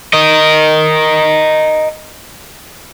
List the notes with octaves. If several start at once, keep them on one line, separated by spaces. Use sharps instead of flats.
A#4 D#5